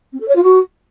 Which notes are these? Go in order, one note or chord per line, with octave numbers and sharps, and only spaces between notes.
C4
A4
C#5
F4
F#4